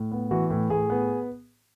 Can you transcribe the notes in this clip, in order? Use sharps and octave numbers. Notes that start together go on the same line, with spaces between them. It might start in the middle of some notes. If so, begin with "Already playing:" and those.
Already playing: A2
B3
E3 F#4
A2
A2 G#4
B3